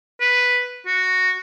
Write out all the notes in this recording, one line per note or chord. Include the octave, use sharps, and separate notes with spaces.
B4
F#4